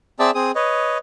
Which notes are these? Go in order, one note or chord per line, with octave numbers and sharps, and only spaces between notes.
C4 G#4 D5 E5 A5 E6
C4 G#4 D#6
B4 C#5 D#5